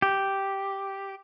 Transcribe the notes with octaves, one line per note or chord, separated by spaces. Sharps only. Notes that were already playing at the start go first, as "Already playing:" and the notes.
G4